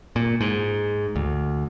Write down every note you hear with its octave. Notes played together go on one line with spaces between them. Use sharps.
A#2
G#2
D2